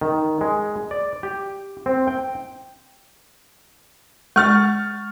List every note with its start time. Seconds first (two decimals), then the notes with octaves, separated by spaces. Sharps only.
0.01 D#3
0.41 G#3
0.91 D5
1.23 G4
1.86 C4
2.08 G5
4.36 G#3 C#6 F6 A6